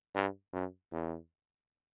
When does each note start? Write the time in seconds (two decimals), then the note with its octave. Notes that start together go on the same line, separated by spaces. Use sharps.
0.15 G2
0.53 F#2
0.92 E2